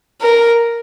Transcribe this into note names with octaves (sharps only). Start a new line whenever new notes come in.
A#4